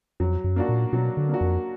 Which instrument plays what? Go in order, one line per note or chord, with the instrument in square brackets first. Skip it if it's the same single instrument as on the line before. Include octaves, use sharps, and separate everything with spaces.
[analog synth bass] F2 [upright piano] F#3
[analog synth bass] F#2
[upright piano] A#3 D4 F#4
[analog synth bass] A#2
[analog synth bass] B2 [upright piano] F#3
[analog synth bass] D3
[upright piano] A#3 D4 F#4
[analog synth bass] F2